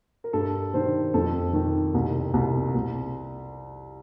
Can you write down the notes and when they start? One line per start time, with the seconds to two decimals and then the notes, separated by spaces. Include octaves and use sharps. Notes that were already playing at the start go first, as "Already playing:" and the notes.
0.24 A#4
0.33 G2 A4
0.74 D#3 C5
1.14 F2 A4
1.53 D#3
1.94 C2
2.33 C2
2.74 C2